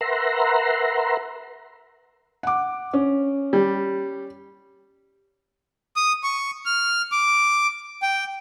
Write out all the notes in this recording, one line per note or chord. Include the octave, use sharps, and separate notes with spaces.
A#4 B4 E5 F#5 A#5 C6
F#5 D6
C#4
G3
D#6
C#6
F6
D6
G5